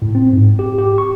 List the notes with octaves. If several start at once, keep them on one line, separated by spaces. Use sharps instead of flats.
A2
C4
G#2
G4
G4
C#6